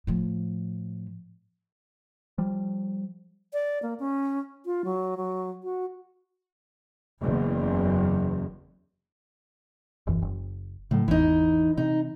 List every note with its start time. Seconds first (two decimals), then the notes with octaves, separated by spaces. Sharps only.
0.07 A2 F3
2.38 F3 G3
3.53 D5
3.83 A#3
4.00 C#4
4.65 F4
4.85 F#3
5.17 F#3
5.63 F#4
7.20 F#1 E2
10.07 E1 F#2 E3
10.22 F#1
10.91 A2 C#3 F#3
11.08 G#1 E2 E3 D#4
11.77 C3 D#4